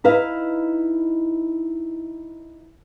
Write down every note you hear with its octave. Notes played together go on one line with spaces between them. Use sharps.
D#4 E4 B4 D#5 F5